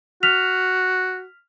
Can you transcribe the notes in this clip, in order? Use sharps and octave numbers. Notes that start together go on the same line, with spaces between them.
F#4 F6 B6 F7